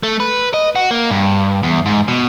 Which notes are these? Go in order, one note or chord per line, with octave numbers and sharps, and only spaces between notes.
A3
B4
D#5
F#4
A#3
G2
E2
G#2
B2